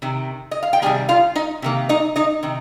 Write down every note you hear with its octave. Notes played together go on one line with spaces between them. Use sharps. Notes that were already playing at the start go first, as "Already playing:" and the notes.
C3 D#3
D#5
F5
G5
C3 D#3 G3 A#3 G#4 G#5
F4 F5
D#4 D#5
C3 D#3 A#3
D#4 D#5
D#4 D#5
C3 D#3